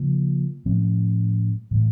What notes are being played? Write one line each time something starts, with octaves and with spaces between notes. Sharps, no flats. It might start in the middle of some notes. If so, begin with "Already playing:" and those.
Already playing: C#3 F3 A#3
A2 F3 A3 C#4
A2 E3 A3